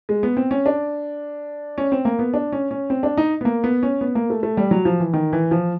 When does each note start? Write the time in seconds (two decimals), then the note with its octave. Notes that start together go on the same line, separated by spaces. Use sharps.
0.09 G#3
0.23 B3
0.37 C4
0.51 C#4
0.66 D4
1.78 C#4
1.92 C4
2.05 A#3
2.19 B3
2.34 D4
2.53 C#4
2.71 C#4
2.90 C4
3.03 D4
3.18 D#4
3.41 B3
3.45 A#3
3.64 B3
3.83 C#4
4.01 B3
4.15 A#3
4.30 A3
4.43 A3
4.57 G3
4.71 F#3
4.85 F3
5.00 E3
5.13 D#3
5.33 E3
5.51 F3